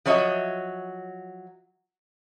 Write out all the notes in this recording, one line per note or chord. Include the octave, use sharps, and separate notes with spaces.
F3 F#3 C#5 D#5 E5